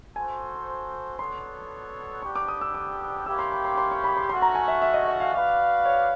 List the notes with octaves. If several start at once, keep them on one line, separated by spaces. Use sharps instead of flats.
F#4 A4 C5 G#5
B3 D4 F#4 A4 C#5 C6
G3 B3 D4 G4 C#6
D6
D#6
E6
D6
A#3 C#4 E4 G4 E6
C6
B5
C6
C6
C#6
B5
C6
A3 C#4 F#4 C6
A#5
G#5
E5
E5
D#5
E5
F5
F#4 B4 D5 F5
C#5